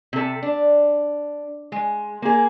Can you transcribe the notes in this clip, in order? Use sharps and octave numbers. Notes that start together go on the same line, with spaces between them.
C3 A4
D4
G#3
A#3 G#4